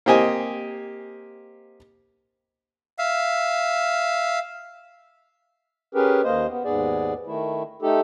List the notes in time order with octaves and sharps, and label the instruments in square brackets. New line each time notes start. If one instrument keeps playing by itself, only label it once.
[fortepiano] A#3 C4 G4 D#5 G#5
[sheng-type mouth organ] E5 F5
[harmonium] C#4 G4 G#4 A#4 B4
D#2 A#3 C5 D#5
B3
D#2 G#2 B3 G#4 D5
D#3 A3 E4
A3 D#4 G4 A4